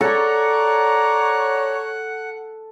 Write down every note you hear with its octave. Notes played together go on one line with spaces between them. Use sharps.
A4 C#5 D5 F#5 A#5